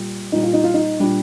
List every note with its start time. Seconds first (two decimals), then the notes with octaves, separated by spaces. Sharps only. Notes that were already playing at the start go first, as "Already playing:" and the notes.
Already playing: A#2 G3
0.32 A#2 G3 D#4
0.43 F4
0.53 D#4
0.64 F4
0.74 D#4
1.00 A#2 G3 D4